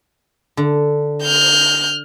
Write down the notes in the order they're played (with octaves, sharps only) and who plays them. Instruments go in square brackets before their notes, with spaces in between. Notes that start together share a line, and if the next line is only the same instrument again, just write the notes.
[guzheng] D3
[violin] F6 G6